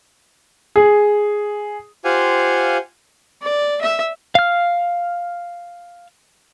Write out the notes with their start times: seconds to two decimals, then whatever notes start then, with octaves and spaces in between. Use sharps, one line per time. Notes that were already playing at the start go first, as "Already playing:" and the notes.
0.76 G#4
2.05 F4 G4 C5 F5 F#5 G#5
3.42 D5
3.82 E5
4.35 F5 F6